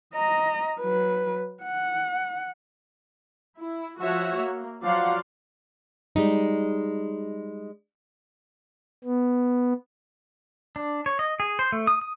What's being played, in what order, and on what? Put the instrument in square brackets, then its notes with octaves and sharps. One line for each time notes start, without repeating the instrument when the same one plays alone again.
[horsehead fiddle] D#5 A#5
F#3 B4
F#5
[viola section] E4
F3 F#4 C#5 E5 F#5
A#3
F3 F#3 D5 F5 F#5 C6
[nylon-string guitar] G3 G#3 D#4
[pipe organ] B3
[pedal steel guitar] D4
C#5
D#5
G#4
C5
A3
D#6
D#6